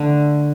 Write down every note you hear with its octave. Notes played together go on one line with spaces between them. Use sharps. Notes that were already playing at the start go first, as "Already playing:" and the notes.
Already playing: D3 A3